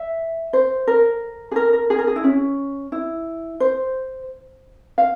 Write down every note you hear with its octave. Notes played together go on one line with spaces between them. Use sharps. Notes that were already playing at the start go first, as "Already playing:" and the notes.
Already playing: E5
C5
A#4
G#4
A#4
A#4
G#4
A#4
G#4
E4
C#4
E4
C5
F5